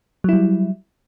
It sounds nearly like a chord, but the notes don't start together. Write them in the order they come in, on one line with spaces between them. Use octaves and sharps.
F#3 E4 G3